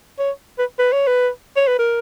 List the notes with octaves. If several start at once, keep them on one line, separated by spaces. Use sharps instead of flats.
C#5
B4
B4
C#5
B4
C#5
B4
A#4